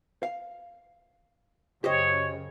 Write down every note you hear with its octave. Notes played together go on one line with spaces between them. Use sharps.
F5
F#2 C#3 G4 C5 C#5 D#5